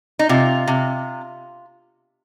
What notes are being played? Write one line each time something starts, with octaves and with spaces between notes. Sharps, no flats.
D#4
C3 F4
C3